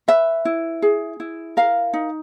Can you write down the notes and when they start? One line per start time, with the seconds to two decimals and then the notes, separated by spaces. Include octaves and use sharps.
0.08 B4 E5
0.45 E4
0.82 G#4
1.20 E4
1.57 A#4 F5
1.93 D#4